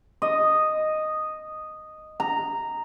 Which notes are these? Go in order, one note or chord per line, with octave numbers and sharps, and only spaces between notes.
D#5
A#5